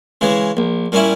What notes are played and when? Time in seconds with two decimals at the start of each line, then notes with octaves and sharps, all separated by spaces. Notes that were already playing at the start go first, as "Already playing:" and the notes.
0.21 C#3 E3 G#3
0.57 A#1
0.92 A#2 G3 C#4 E4